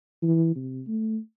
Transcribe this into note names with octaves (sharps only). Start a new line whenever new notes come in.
E3
C3
A3